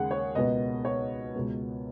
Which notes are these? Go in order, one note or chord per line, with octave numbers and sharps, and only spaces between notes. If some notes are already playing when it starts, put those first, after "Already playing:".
Already playing: D#2 C#3 G#3 G#4 F#5
C#5
C#2 B2 B3 D#5
C#5
C#2 B2 G#3 B3